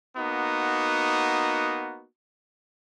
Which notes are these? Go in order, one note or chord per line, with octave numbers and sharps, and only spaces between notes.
A#3 B3 D#4 F#4